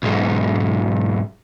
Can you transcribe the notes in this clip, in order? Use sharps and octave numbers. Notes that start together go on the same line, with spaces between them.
B1 G#2